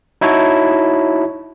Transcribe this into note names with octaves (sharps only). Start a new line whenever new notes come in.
D#4 E4 F#4 C#5 A5